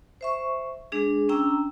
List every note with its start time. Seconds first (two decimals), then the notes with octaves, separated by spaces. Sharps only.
0.21 C5 E5 C#6
0.92 G#3 D4 G#4
1.29 C#4 D4 G5 A#5 E6